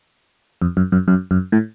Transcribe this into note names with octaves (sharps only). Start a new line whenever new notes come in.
F2
F#2
F#2
F#2
F#2
A2